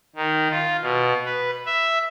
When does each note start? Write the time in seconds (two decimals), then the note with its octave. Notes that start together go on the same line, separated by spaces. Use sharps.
0.16 D#3
0.50 F4
0.82 B2
1.25 B4
1.66 E5